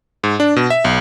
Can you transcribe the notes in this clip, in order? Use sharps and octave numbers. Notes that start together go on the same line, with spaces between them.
G#2
D4
B2
E5
B1